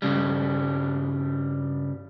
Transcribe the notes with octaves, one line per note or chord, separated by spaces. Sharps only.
G2 C#3 G3